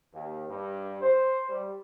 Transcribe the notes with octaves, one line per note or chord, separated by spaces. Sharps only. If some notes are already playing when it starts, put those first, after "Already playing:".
D#2
G2
C5
G3